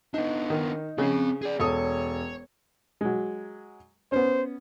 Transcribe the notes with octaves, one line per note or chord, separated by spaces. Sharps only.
B3 D4 D#4
D#3
C#3 C4 F5
G#4 D5
E1 A4 C#5 D#6
F#3 G#3
B3 C#4 C5